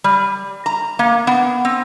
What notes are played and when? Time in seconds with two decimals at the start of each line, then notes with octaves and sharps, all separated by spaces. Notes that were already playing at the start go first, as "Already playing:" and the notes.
0.04 G3
0.66 A#5
0.99 A#3
1.27 B3
1.65 C4